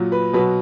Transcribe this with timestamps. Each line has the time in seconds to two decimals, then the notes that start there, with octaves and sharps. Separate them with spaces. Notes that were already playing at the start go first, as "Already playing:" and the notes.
Already playing: A#2 F#3
0.12 B4
0.33 B2 F#3 B4